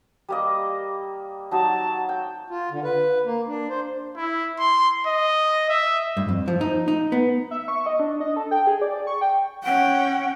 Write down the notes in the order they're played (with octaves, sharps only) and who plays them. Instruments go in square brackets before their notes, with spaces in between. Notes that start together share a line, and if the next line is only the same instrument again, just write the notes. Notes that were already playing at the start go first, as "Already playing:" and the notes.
[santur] G3 A#3 D#5
[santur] F#3 D#4 [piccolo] A5
[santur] G5
[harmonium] F4
D3
B4
A#3
D4
C5
[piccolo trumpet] E4
C6
D#5
E5
[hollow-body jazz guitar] G2
F2
F3
D#4
D#4
B3
[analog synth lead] E5
C#6
D#5
D4
D#5
A4
G5
G#4
D5
C#6
G5
[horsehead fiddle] C#4 G5 [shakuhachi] F#5